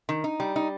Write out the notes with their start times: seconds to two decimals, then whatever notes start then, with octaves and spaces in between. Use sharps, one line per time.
0.09 D#3
0.24 D#4
0.40 G3
0.56 D#4